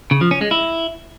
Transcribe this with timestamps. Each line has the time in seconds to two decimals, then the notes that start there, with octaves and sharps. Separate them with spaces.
0.11 C#3
0.21 F3
0.31 C#4
0.41 G#3
0.51 E4